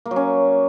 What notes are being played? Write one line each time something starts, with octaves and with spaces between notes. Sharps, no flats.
A#3
F#3
C#4